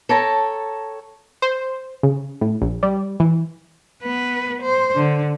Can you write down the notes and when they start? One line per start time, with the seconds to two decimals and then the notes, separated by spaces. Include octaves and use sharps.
0.09 A4 C#5 G5 A5 A#5
1.42 C5
2.03 C#3
2.41 A2
2.61 A#1
2.83 G3
3.20 E3
4.02 B3 B4
4.62 C5
4.96 D3